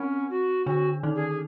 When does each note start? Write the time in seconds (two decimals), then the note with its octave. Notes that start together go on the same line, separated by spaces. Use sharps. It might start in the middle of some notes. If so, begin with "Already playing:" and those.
Already playing: C4 C#4
0.30 F#4
0.66 D3 D4 F#4
1.03 D#3 D#4
1.15 G#4